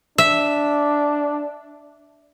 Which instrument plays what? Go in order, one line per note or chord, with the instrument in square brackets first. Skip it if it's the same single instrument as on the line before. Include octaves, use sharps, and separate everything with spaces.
[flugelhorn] D4 [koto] E5